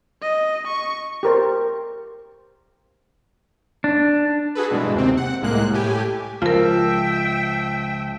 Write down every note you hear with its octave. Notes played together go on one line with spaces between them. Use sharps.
D#5
C#6
G4 A#4 C5
D4
F#4 G#4 A4 B4
G2 B2 E3 G#3
D#2 C3 C4
F#5
C2 A2 G#3 A#3 F#6
A2 G4 G#5
C#2 F3 F4 A#4 E5 G5